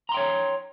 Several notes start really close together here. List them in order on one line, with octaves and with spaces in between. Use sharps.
A#5 C6 G5 C#5